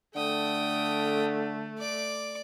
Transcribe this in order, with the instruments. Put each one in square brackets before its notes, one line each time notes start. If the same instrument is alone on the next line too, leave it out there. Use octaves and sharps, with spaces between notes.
[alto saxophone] D3 [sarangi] A3 [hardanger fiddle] G5 D#6
[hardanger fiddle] D5 D6